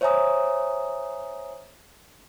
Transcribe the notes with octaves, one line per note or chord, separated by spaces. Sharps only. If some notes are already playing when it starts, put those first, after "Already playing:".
C5 C#5 E5 G#5 A#5 D#6